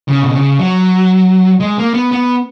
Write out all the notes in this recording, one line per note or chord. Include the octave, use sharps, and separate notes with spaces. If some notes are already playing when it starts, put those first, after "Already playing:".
C#3
B2
C#3
F#3
G#3
A#3
B3
B3